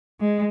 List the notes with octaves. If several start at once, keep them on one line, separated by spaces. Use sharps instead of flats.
G#3